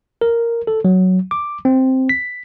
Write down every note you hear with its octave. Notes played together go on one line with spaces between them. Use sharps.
A#4
A4
F#3
D6
C4
B6